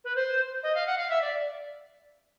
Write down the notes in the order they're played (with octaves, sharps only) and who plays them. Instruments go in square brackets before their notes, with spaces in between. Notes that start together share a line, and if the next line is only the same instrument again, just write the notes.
[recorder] B4
C5
D#5
F5
F#5
F5
E5
D5